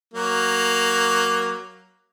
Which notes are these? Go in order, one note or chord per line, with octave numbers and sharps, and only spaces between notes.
F#3 A#3